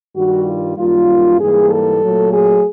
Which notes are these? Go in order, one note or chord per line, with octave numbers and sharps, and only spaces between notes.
G2 D#3 G3 F#4
F4
F#2 D#3 G3 A#3 F4
G#2 E3 G3 A#3 G#4
A4
A#2 F#3 A3
G#4